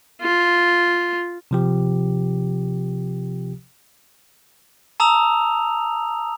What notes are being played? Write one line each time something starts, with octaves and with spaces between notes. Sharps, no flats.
F4
C3 F3 G4
A5 A#5 D#6 E6 F7